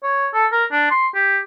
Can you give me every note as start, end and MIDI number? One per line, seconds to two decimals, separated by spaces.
0.03 0.27 73
0.34 0.46 69
0.52 0.65 70
0.72 0.86 62
0.91 1.08 84
1.15 1.39 67